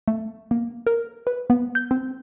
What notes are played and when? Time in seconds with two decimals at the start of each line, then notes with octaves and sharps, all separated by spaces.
0.08 A3
0.51 A#3
0.87 A#4
1.27 B4
1.50 B3
1.75 G6
1.91 C4